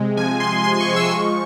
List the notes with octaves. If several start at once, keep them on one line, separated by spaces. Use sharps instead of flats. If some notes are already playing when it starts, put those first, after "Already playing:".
Already playing: C3 G#3
F3 G#5
C3 C6
C3 C6
C#6
G#3
E6
F3 C#6